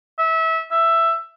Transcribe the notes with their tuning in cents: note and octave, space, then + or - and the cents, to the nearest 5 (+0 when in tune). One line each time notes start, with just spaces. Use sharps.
E5 -25
E5 +10